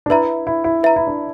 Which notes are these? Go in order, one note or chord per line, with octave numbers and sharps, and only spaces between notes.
D4
E4 B4 E5 A#5
E4
E4
B4 E5 A#5
E4
D4